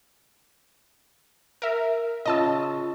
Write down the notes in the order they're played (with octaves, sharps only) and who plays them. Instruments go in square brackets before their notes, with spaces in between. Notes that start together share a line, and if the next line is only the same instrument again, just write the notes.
[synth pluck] A#4 E5
[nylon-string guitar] C#3 F4 [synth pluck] D#5 A5 E6